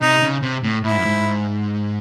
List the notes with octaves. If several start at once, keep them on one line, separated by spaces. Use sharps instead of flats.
C3 D#4
C#3
C3
A2
A2 E4
G#2
F#2
G#2